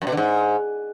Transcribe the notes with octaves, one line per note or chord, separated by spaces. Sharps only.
F#2
B2
D3
G#2